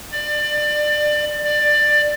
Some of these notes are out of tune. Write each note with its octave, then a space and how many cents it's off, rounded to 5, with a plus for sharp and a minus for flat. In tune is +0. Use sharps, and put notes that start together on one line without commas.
D5 +25
D5 +15